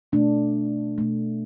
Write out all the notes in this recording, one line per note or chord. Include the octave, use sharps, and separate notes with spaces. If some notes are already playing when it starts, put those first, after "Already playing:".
B2 A3 D4
B2 A3